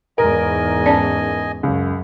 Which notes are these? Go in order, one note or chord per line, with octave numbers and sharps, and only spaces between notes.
E2 G#2 A#4 D#5 G#5
C#4 D5 A5
C#2 F#2